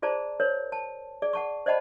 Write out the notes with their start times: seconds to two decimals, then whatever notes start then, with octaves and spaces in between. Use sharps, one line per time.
0.02 F4 G#4 C5 D5 A5 A#5
0.40 A#4 C5 C#5
0.72 A5
1.22 G#4 D5
1.33 F#5 A5 C#6
1.66 C5 D5 D#5 F#5 A5 B5